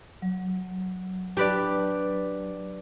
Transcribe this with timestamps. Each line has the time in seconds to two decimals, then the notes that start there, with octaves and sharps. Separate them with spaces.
0.22 F#3
1.37 D4 G4 B4 D5